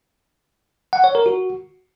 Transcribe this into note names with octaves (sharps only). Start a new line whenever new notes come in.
F#5
C#5
A#4
F#4